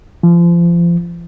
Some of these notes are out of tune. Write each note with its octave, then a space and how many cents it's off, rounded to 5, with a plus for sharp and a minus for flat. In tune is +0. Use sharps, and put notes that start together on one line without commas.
F3 -30